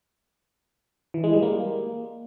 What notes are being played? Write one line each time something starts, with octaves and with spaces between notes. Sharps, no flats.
E3
G#3
G3
A#3